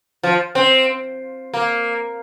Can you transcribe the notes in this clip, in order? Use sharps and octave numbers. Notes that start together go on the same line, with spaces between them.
F3
C4
A#3